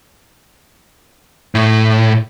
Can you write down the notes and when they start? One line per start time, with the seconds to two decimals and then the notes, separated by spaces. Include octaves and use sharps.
1.55 A2